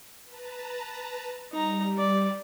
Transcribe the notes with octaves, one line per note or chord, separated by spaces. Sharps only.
B4 A5 A#5
G3 D#4 A#5
D5